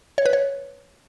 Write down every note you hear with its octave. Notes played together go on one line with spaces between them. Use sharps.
C#5
B4
C#5